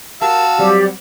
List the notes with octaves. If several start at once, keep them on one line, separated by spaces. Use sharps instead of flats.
F#4 G4 A#4 F5 A5 E6
F#3 G3 C4 G4 D5